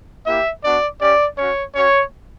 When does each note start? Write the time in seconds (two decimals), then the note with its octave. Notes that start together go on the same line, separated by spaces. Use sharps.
0.26 A#3 E4 G4 E5
0.64 B3 D4 F#4 D5
1.01 C#4 G4 D5
1.38 C#4 F#4 C#5
1.75 C#4 F#4 C#5